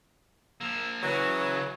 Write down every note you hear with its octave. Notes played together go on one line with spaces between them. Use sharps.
F3 A#3 E6
C#3 E3 F#3 F#4
F#4 C#5